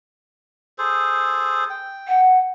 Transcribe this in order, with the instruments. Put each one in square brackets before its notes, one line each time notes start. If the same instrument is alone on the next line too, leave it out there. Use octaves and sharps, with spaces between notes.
[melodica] G#4 A4 C5
G5
[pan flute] F#5